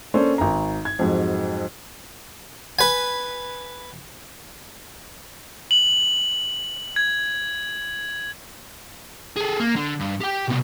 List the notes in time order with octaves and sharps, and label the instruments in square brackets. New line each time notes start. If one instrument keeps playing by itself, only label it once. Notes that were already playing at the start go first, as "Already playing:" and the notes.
[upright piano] A#3 C#4 D4 A4 C5
G#1 A#5
G#6
F2 G#2 F#3
[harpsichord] B4 G#5
[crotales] F#7
G#6
[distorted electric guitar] G#4 A4
A#3
D3
G2
G4 G5
C2 B2